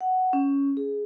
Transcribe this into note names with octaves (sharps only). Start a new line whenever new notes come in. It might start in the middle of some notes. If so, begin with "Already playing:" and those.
F#5
C#4
G#4